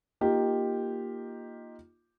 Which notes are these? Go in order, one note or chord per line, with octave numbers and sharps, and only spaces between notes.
A#3 D#4 F4 G4